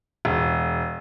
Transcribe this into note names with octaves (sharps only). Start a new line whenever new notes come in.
E1